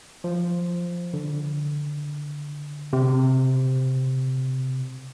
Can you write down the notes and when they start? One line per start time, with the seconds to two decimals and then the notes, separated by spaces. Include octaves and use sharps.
0.24 F3
1.14 D3
2.93 C3